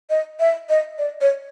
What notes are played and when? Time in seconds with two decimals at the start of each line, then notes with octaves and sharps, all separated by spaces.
0.10 D#5
0.40 E5
0.69 D#5
0.98 D5
1.21 C#5